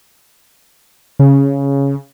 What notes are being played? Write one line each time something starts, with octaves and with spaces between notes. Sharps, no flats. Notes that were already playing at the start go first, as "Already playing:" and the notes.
C#3